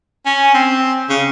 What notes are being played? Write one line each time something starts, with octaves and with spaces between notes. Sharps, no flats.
C#4
C4
C#3